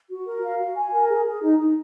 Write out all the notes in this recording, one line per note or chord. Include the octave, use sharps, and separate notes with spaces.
F#4
A#4
F5
F#4
G#5
A#4
G#4
G#4
D#4
D#4